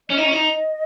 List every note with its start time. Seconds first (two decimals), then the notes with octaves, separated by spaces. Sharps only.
0.09 C#4 D#5
0.17 D#4
0.25 C#4
0.32 D#4